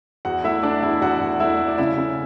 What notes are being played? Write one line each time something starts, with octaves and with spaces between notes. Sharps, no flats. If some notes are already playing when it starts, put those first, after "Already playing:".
E2 F#4 F#5
A3 E4 E5
A3 D4 D5
E2 E4 E5
E2 F#4 F#5
E2
A3 E4 E5
A3
D5
C#3 E4 E5
C#3